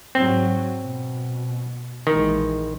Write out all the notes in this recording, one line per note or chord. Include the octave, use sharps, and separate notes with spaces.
G#2 F#3 C4
B2
A#1 D#3 E3 G#3